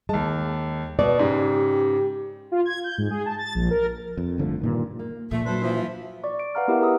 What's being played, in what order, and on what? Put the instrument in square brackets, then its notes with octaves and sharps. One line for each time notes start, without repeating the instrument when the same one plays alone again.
[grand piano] D#2 A5 [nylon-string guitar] G#3
[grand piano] B2 [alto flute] B3 [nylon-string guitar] D5
[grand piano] G#2 C#3 [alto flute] G4
[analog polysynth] F4
G#6
G6
G#2
G#4
A5
A6
A#1
A#4
[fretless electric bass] F2
G1 D3 F3 A3
G2 A#2 D#3
[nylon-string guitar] A#3
[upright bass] A#2 [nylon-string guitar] F3 [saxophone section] A3 [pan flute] E5
[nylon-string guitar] F#3 D4 [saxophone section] A4 B4 C5
[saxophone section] E3 F3
[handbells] D5 C#6
D7
B4 F5 F#5 A#5 F6
B3 E4 G4 A#4 E5 F6
G#4 B4 A#5 D#6 E6